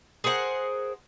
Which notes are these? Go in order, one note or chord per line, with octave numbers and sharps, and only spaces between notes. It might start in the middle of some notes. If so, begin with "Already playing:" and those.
G#4 A#4 C5 F#5